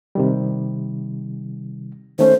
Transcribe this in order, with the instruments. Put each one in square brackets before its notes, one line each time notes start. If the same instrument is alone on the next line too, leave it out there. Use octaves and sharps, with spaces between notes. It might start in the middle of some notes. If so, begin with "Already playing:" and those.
[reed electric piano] C3 D#3 G3
[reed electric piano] D#3 A3 C#4 [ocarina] C5